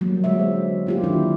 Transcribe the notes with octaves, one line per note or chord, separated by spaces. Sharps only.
F#3 G3 A#3
D3 G#3 F#4 E5
C5
A#3 F4 G4
D3 D#3 F#3 D4 E4